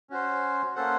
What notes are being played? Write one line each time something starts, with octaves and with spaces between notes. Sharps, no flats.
C#4 F#4 C5
A#3 C#4 A4 C5 F#5